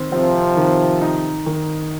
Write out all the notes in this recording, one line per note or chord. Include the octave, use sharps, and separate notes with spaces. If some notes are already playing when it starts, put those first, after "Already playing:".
Already playing: D#3 C4
C3 F3 C4
D#3
D#4
D#3